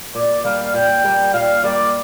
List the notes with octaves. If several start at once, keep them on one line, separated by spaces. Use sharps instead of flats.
A#2 D5
G3 A#3 G4 F5
A#2 G5
G3 A#3 G4
A#2 F5
G3 A#3 G4 D5